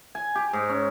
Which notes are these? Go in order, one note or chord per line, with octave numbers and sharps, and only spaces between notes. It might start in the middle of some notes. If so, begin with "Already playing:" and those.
G#5
G4
G#2
C#4